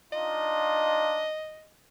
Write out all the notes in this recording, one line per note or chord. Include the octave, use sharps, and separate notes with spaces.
D4 D#4 F4 D#5